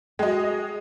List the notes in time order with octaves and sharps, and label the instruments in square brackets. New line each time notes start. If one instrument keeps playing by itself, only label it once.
[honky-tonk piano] G#3 D#5 [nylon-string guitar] F#4 G5